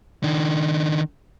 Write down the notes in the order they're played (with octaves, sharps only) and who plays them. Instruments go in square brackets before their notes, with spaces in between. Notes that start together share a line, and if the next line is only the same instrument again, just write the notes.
[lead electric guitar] D#3 D4